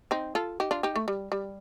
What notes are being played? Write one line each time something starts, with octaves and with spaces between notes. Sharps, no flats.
C4 D#4
F4 A4
D#4 G4
D4 F4
D#4 G4
A3
G3
G3